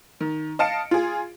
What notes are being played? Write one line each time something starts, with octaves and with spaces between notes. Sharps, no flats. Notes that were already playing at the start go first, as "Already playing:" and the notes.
D#3
D#5 F5 A5 C#7 D7
F4 G#4